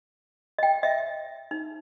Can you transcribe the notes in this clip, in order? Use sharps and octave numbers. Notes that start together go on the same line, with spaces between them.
D#5 G5
D#5 E5
D#4